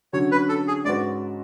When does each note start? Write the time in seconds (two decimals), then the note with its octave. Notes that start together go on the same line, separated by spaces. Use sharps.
0.13 D3 F#3 C#4 C#5
0.32 B4
0.49 A4
0.68 G#4
0.85 G#2 G#3 C#4 F#4 B4 D5